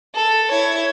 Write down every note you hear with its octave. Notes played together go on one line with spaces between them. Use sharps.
A4
E4 C#5